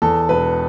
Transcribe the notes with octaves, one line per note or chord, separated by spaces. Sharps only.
E2 A4
E1 B4